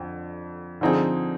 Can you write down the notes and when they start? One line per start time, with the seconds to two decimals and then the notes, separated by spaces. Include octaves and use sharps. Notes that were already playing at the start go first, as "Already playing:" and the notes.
Already playing: F2 D3
0.81 D3 F3 C4 D#4 G#4